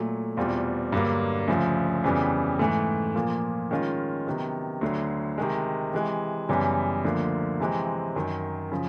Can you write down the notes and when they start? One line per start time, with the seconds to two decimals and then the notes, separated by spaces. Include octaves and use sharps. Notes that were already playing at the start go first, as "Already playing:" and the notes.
Already playing: A#2 F#3 A3
0.37 E2 B2 G3 C4 F4
0.92 G2 D3 F#3 A#3
1.48 D2 C#3 F3
2.04 F2 C#3 E3 G3 B3
2.59 G#2 E3 A3
3.15 A#2 F3 A#3
3.71 D#3 G#3 C#4 F4
4.27 C3 D#3 F#3 B3
4.81 D2 D3 F#3
5.38 C3 D#3 G#3
5.93 C3 E3 G#3
6.49 F#2 C#3 E3 G3 B3
7.04 D2 D3 F3 A#3
7.60 C3 E3 G#3 C4
8.16 F#2 D#3 F#3
8.72 C#3 F3